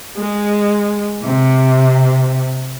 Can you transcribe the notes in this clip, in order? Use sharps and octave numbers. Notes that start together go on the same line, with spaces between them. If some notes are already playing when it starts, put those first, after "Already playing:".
G#3
C3